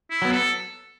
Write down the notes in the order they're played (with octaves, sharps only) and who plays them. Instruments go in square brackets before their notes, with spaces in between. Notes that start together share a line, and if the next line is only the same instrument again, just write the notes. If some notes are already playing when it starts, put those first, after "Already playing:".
[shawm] E4
[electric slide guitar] F#3 B3
[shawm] A4